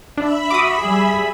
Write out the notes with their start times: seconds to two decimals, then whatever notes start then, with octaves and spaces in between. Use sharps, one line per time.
0.17 D4 E5 B5
0.50 F#4 D6 D#6
0.82 G3 G#4